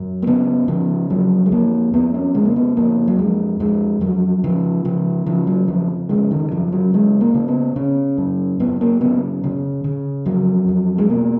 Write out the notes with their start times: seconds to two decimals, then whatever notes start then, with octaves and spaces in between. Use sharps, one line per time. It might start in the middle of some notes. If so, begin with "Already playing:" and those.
Already playing: F#2
0.22 A#3
0.27 C#3 B3
0.68 C#3 F3
1.10 F2 F#3
1.46 G#3
1.52 F2 A#3
1.94 F2 B3
2.14 C#4
2.35 C#3 G#3
2.45 A#3
2.56 B3
2.77 F2 A#3
3.08 F#3
3.18 F2 G#3
3.60 F2 G#3
4.01 F2 F#3
4.44 C#3 F3
4.85 C#3 F3
5.26 C#3 F3
5.47 F#3
5.68 F2 F3
6.09 C#3 G#3
6.31 D#3
6.51 F#2 F3
6.72 F#3
6.94 C#3 G#3
7.21 A#3
7.34 C#3
7.48 B3
7.76 C#3 C#4
8.18 F#2
8.60 F#2 B3
8.81 A#3
9.01 C#3 B3
9.44 C#3
9.84 C#3
10.26 F2 F#3
10.68 F2
10.98 G#3
11.09 B2 A#3